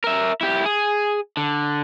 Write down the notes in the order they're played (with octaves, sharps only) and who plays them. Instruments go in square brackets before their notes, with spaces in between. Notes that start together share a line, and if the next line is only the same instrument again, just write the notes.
[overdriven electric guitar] A#4 E5
E4 G4
G#4
D3